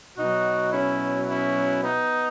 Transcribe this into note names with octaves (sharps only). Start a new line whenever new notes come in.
B2 F#3 D#4 F#4
C#4 E4
C#4 E4
B3 D#4